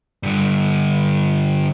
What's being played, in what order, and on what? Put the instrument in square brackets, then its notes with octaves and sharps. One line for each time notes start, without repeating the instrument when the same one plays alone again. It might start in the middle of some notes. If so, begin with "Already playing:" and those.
[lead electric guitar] G2 D3